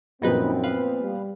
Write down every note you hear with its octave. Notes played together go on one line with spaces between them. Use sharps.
F#2 A#2 D#3 F3 B3 C4 D#4 B4
B4 F5
G3